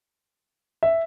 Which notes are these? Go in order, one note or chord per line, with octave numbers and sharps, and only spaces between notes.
E5